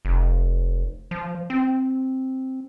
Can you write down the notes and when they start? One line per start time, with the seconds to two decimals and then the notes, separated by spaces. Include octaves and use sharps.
0.05 F1
1.11 F3
1.50 C4